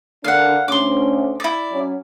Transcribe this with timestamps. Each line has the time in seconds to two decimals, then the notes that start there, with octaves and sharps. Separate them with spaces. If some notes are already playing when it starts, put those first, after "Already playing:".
0.24 D3 D4 A#4 F5 F#5
0.68 D2 C#4 C6 D6
1.40 E4 D5
1.72 F#3 C#4